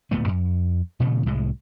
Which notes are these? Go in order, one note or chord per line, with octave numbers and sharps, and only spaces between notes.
D1 A#2 A3 B3
F2
A#2 C#3 E3 A3
C2 A2 G#3